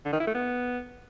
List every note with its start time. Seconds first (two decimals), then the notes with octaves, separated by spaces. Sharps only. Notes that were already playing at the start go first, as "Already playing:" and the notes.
0.05 D3
0.13 D#3
0.20 E4
0.27 A3
0.35 B3